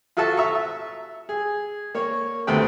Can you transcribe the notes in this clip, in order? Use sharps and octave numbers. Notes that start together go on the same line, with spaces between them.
F4 F#4 A4 E5 A5
E5 A#5 C#6
E5
G#4
A#3 C#5
D2 C3 A3 B3 C4 G5